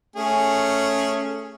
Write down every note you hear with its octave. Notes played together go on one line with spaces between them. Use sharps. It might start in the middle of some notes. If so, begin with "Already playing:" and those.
A3 C#4 G#4